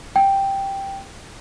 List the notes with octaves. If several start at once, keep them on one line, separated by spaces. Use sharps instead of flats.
G5